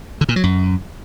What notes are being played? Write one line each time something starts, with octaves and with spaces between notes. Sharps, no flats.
D3
A#2
F#3
F#2